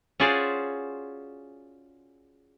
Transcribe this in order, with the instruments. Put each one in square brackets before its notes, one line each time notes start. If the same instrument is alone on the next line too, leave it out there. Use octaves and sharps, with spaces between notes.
[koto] C#4 F4 F#4 G#4 C5 D5